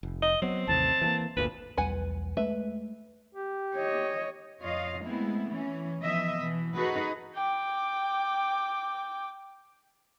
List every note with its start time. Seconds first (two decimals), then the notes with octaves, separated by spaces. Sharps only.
0.03 F1
0.22 D#5
0.42 F#3 B3 C4
0.67 A1 D#2 C3 A5
1.01 E3 G3 A#3
1.37 G1 D2 A#2 B4
1.77 B1 E2 G3 B4 F#5 G#5
2.37 G#3 A3 B4 E5
3.35 G4
3.75 C#5 D#5
4.60 F2 F4 C#5 D#5 F5
5.03 G#3 A3 B3 C4 E4
5.49 E3 C#4
6.02 E3 F3 B3 D#5 E5
6.38 B2 E3
6.75 D#4 F#4 G#4 A4 B4
7.35 G5 D6